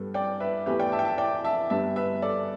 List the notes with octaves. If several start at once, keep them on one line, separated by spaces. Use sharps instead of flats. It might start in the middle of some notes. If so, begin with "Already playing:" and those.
Already playing: G2 G3 B3 A4
D5 G5
B4 E5
E2 E3 A3 G4 B4
D5 G5
E5 A5
G5
E5 A5
D5 G5
E5 A5
G1 G2 G3 B3 E5 A5
B4 E5
A4 D5